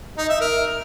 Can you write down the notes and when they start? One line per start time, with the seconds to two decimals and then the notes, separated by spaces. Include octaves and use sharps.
0.18 D#4
0.29 E5
0.41 A#4